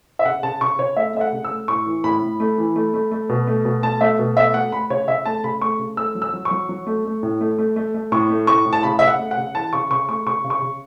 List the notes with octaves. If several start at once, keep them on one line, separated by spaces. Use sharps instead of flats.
E5
C#3 F#5
C#3 A5
C#3 C#6
C#3 C#5
A3 E5
A3 E5
F#5
C#3
E6
A3
A2 C#6
E3
A2 B5
A2
A3
E3
A3
A3
A3
B2
A3
B2
A3 A5
A3 E5
B2
A3 E5
A3 F#5
A3 B5
C#3 C#5
C#3 E5
A3 A5
C#3 B5
A3 C#6
C#3
A3 E6
F#3
E6
F#3
C#6
F#3
F#3
A3
A3
A2
A3
A3
A3
A3
A2 C#6
A3
A2 C#6
A2
A5
C#3 B5
C#3 E5
F#5
A3
F#5
C#3
E3 A5
C#3 C#6
C#3 C#6
A3 C#6
C#3 C#6
C#3
C#6
C#3